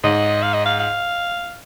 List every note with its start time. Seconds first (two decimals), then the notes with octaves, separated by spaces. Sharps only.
0.04 G#2 D#5
0.43 F5
0.54 D#5
0.66 F5
0.80 F5